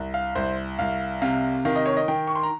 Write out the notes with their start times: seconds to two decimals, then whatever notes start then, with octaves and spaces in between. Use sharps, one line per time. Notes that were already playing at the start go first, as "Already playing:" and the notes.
Already playing: C2
0.14 F5
0.35 C2 C5
0.79 C2 F5
1.22 C3 F5
1.65 D#3 F5
1.76 D#5
1.86 C#5
1.97 D#5
2.08 D#3 G5
2.27 C#6
2.35 C6
2.43 A#5